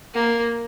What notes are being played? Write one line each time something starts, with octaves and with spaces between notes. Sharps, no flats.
A#3